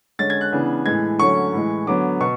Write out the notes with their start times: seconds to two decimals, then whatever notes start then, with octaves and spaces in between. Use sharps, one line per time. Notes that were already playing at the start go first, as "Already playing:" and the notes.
0.19 D3 G#3 C#4 A6
0.30 G#6
0.41 F#6
0.52 C#3 E3 B3 D4
0.86 A2 E3 G#3 G#6
1.19 D3 F#3 A3 C#4 C#6
1.53 A2 E3 G#3
1.87 D3 F#3 B3 D6
2.21 B2 C#6